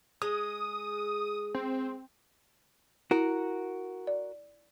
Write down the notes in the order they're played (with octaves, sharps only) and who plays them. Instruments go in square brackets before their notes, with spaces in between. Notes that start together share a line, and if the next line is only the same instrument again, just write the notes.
[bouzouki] G#3 [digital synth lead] D#6
[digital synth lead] C4
[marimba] E4 [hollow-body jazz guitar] F#4 A#4
[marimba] D5